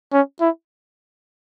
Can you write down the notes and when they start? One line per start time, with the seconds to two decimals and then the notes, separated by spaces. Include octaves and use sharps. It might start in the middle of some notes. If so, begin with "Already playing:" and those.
0.12 C#4
0.41 E4